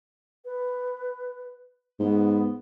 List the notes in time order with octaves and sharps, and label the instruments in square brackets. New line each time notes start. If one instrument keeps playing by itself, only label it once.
[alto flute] B4
[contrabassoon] G#2 [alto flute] B3